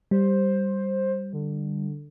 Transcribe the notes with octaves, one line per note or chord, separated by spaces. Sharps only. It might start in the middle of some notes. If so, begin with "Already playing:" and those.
G3 C5
D3